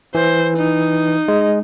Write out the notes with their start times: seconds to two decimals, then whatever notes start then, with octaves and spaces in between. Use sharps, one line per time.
0.15 E3 C5
0.56 D#4
1.28 G#3